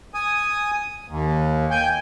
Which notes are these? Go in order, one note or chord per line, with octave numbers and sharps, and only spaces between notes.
G#5 D#6
D#2
G5 G#5